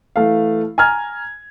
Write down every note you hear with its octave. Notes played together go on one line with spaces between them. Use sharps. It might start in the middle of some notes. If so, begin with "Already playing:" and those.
E3 A3 F5
G#5 A#5 F6 G#6